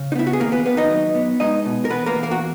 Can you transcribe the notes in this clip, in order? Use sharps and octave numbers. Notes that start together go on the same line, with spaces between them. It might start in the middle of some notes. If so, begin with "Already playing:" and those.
Already playing: C#3
D#4
B3 E4
F#4
G#4
D#2 A#3 A#4
B3 B4
D#2 B3 B4
D#4 D#5
F#3
B3
G#3 D#4 D#5
B2
A#4
E2 B3 B4
A#3 A#4
E2
A#3 A#4
F#4